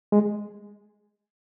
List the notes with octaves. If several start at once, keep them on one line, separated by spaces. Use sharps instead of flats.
G#3